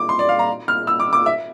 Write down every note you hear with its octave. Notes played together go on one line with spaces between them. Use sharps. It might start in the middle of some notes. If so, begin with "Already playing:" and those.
Already playing: D6
C6
D5
F5
A#5
F6
E6
D6
D6
E5